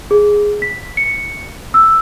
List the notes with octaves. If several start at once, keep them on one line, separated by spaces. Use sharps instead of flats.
G#4
B6
C#7
E6